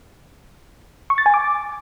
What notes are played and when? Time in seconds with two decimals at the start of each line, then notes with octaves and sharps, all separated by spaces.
1.10 C#6
1.18 A6
1.26 G#5
1.34 D6